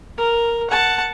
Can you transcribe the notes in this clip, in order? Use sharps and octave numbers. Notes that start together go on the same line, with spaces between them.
A#4
F#5 A5